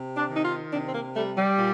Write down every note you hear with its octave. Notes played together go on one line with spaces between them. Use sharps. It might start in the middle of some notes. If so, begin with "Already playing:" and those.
Already playing: C3
D4
D#3
D#4
F4
C3 D4
C4
A#3
G3 A3
G3
A#2